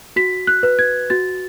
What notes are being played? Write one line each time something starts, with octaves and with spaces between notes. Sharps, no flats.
F#4 B6
F#6
B4
G#6
F#4 A6